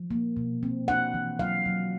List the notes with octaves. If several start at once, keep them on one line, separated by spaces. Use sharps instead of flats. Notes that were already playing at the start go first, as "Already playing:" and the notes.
Already playing: F3
A#3
B2
C4
D4 F#5
E3
F#3 F5
F#3